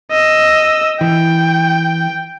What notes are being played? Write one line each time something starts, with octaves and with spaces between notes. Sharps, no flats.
D#5 E6
E3 G5